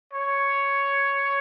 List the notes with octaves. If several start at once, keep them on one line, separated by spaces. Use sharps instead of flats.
C#5